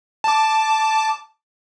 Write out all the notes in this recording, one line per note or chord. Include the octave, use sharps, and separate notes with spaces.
A5 D6